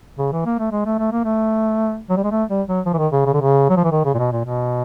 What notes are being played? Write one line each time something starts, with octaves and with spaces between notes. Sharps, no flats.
C#3
E3
A#3
A3
G#3
A3
A3
A#3
A3
F#3
G3
G#3
A3
G3
F#3
F3
E3
D#3
C#3
C#3
D3
C#3
F#3
F3
E3
D#3
C#3
A#2
B2
A#2
B2